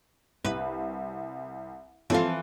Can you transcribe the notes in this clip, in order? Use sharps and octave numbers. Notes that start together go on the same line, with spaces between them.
C2 B4
E3 F3 C4 F4 A4